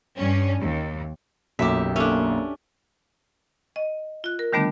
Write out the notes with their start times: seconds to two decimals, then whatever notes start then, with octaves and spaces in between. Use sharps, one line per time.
0.17 G2 C#4
0.61 D#2
1.59 B1 F#2 A#2 A3 F#4 G4 E5
1.96 A#3 C#4 D4 E4 A4 E5
3.76 D#5
4.24 F4 F#6
4.39 A#4
4.53 D3 D#3 G3 A3 B3 D4